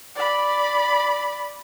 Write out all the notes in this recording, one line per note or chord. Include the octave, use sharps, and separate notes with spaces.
D5 B5